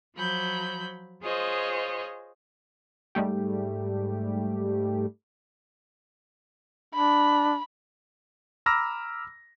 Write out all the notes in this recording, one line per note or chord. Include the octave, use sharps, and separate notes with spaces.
F3 F#3 B5 G6
F4 G#4 C5 C#5 D#5
G#2 G3 A3 G4
D4 B5
A#5 B5 D6 E6 F6 A#6